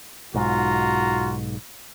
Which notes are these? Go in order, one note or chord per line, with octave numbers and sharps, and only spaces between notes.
B1 G#2 F4 F#4 A#5